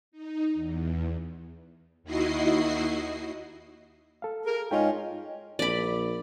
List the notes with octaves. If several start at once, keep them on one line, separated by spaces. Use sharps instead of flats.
D#4
E2
D#2 D#3 E4 F#4 D#5 C7
A4 F5
G#4 A#4
G#2 C#4 F4 D#5 G5
A#1 D5 B5